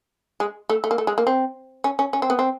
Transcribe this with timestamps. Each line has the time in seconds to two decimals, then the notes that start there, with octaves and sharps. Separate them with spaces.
0.40 G#3
0.69 A3
0.84 A3
0.91 A#3
0.98 A3
1.07 G#3
1.18 A#3
1.27 C4
1.84 C#4
1.99 C#4
2.13 C#4
2.22 C4
2.30 B3
2.39 C4